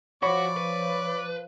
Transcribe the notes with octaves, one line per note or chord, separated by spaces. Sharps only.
F3 F#4 C#5 D5 B5 C#6
B4